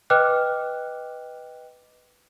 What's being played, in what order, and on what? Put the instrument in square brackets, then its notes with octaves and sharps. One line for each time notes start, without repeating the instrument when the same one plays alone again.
[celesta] B4 D#5 G5 D6 F6 F#6